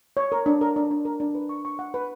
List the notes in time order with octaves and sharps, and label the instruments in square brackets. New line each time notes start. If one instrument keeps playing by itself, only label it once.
[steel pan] C#5
A#4
D4
A#4
D4
D4
A#4
D4
B4
C#6
C#6
F#5
B4